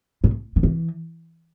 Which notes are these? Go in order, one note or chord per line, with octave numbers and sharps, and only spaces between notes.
A2
D#3
E3